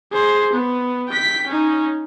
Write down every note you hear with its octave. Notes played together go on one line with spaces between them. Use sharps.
G#4 C5
B3
G5 B6
C#4 D#4